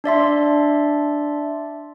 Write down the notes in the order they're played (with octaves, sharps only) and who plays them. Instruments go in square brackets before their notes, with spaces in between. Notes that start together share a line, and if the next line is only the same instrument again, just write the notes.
[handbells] D4 D5 E5 C6